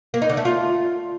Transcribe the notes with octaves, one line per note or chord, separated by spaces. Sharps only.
A#3
D#4
D3
A3
F4